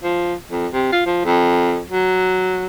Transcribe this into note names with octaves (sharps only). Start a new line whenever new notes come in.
F3
F2
C3
F4
F3
F2
F#3